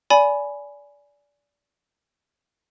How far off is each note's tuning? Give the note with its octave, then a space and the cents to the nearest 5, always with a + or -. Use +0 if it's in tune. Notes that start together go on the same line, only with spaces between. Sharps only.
D5 -20 G#5 +5 B5 +0